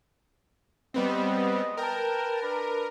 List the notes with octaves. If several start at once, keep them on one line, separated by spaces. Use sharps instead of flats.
G3 G#3 B3 C4 D#5
A#4 B4 G5 A5
D4 B4